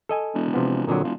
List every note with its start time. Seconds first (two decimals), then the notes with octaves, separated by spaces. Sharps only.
0.09 A4 D#5 G#5
0.34 E1
0.54 C3 F3 B3
0.87 F2 A#2 D3 F#3
1.04 E1 F4